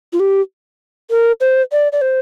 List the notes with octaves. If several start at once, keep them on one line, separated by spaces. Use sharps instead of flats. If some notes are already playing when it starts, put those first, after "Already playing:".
F4
G4
A#4
C5
D5
D5
C5